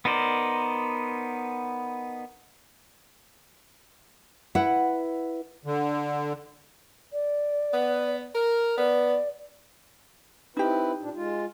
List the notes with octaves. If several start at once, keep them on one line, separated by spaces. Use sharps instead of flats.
B3 D#4 A#4 C5 D5
E4 B4 F#5
D3
D5
B3
A#4
B3 D5
C4 D#4 E4 G4 B4
A#2 D4
G#3 F4